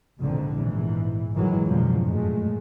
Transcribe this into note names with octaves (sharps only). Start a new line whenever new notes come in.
A#1 F2 G#2 B2 D3 D#3
A#1 E2 G#2 E3
G1 D#3 E3 F#3 G#3
F2 G#2 B2 D3 F3 F#3
F#2 A#2 G#3 A3